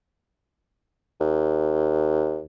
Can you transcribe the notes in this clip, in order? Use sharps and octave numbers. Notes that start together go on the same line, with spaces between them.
D#2